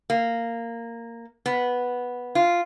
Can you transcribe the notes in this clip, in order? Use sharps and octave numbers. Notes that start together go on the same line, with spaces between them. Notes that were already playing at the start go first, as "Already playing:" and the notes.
A#3
B3
F4